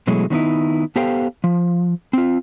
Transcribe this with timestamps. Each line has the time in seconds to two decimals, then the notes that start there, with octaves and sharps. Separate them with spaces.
0.07 B2 E3 F#3 G#3 A3
0.30 D#3 B3 C4 D#4 E4
0.96 B3 G4 A4 C5 F5 G5
1.44 F3
2.13 C4 F4